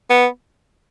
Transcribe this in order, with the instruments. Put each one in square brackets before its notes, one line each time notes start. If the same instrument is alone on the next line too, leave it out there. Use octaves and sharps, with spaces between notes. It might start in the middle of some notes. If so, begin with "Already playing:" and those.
[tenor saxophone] B3